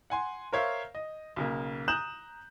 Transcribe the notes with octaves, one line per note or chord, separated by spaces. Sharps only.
F#5 G#5 C6
A#4 C5 C#5 E5 F5
D#5
B1 C#3 A#3
A#5 D#6 F#6 G6 E7 F#7